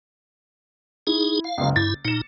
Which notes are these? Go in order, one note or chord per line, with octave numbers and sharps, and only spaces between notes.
D#4 E4 G#4
F5
F#1 C#2
G2 E4 A6
A#2 D#4 C#7 E7